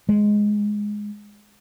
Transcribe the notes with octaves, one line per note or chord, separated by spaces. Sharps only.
G#3